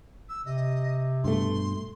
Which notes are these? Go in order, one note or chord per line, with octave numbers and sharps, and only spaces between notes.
E6
C3 D#5
G2 B2 A3 C6